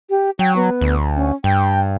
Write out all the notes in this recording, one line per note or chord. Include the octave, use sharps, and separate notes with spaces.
G4
F#3 G5
B3
D2
C#4
G2 G5